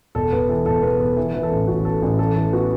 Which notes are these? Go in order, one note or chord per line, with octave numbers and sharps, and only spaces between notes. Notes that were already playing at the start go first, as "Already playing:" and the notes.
E1 A4
E1 B3 B4
E3 A4
E1 A4
E2 B3 B4
E2 A4
E3
E3 B4
A4
A1
A1 F#4
B3 A4
A1
E3 A4
E3 A4
B3 F#4